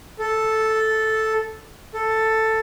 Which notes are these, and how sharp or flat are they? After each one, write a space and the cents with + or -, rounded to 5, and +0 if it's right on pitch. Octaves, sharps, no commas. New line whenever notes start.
A4 -5
A4 +5